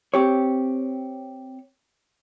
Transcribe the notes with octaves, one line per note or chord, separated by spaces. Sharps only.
C4 G4 C#5